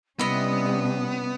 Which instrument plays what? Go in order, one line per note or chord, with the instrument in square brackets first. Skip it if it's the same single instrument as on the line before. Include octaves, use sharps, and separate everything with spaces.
[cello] C3 C#4 [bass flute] G3 [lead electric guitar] B3 [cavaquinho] E4 D#5